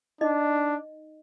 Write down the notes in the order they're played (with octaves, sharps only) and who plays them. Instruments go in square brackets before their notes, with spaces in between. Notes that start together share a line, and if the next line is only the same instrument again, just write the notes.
[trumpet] D4 [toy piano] D#4 D#5